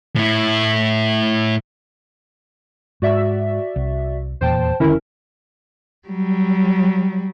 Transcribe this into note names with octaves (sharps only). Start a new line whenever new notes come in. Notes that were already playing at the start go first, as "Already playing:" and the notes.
A2 E4
G#2 F#4 D5 E5
C2
D#1 E2 A#2 C5 G5 A5
E1 D3 D#3 C#4 E4 A#4
F#3 G3